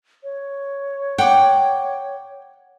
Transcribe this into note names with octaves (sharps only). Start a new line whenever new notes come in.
C#5
F#5 G5 D6